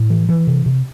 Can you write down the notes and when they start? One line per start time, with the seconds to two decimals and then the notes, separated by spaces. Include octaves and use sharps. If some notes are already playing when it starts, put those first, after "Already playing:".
Already playing: A2
0.10 E3
0.29 E3
0.47 C3
0.66 C3